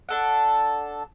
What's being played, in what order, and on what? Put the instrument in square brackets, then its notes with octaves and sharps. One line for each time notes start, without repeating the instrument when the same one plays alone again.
[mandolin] D4 A4 F#5